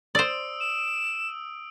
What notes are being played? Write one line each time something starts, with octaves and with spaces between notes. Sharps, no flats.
C5 D5 D#6 E6 D7
E7